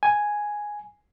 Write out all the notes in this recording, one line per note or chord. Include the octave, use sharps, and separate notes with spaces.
G#5